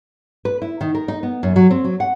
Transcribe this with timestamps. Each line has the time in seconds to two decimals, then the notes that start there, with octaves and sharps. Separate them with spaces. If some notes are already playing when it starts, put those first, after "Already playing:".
0.45 B4
0.62 E4
0.81 D#3
0.95 A#4
1.08 D#4
1.23 B3
1.43 F#2
1.56 F#3
1.71 C4
1.84 F#3
2.00 F#5